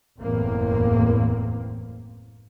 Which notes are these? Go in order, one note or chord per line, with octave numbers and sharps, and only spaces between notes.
F#1 E2 A2 A#3 C4